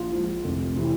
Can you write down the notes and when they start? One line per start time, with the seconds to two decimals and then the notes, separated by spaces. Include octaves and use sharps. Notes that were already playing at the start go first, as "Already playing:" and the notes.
Already playing: A#1 F4
0.11 G#2 F3
0.44 F1
0.76 C3 E3